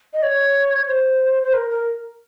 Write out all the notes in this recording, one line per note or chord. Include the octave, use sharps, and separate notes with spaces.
D#5
C#5
C5
C5
A#4
A#4